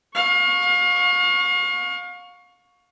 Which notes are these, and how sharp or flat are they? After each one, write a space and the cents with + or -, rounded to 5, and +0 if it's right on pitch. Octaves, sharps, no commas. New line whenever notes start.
F5 +35 C#6 +0